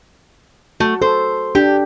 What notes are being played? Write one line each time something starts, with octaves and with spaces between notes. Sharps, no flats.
A3 F#4
A4 C5
D4 G4